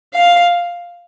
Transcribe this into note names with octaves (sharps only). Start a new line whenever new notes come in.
F5